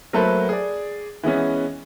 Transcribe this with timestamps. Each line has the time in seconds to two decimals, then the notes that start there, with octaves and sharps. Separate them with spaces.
0.13 F#3 A3 A#3 A4 B4 C5
0.49 G#4 D5
1.23 E3 G#3 B3 C#4